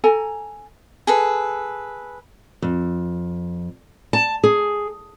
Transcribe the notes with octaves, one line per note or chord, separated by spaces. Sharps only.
A4 G#5 A#5
G#4 A4 B4
F2
A5
G#4